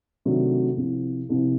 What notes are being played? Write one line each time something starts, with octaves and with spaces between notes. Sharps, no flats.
C3 D#3 F#3 A3 D4
C2 C3 F3
C2 C3 F3